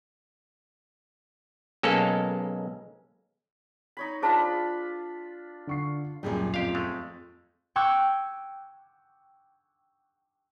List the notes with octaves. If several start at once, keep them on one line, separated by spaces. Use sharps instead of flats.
B1 G#3 A#3 C#4 A4
D#4 C#5 B5
D4 F4 G#4 C5 A5 B5
D3 C#6 C7
D1 F#2 A#2 G3 G#4 D5
F2 G4 F5
G#3 A3
G5 C#6 D6 E6 F#6 G#6